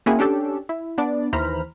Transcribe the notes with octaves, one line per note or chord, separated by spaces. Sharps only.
A#3 C4 C#4 E4 F#4 G#4
C#4 D4 G4 A4
E4
B3 D4 D5
D#2 E3 C5 A#5 B5 F6